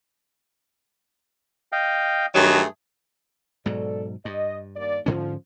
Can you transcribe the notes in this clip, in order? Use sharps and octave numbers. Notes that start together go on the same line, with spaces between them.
D#5 F5 G5
G2 D#3 F#3 A3 G#4
G#2 B2 F#3 A4 D5
G2 D#5
D#2 A#3 D5
G#2 D3 F3 C#4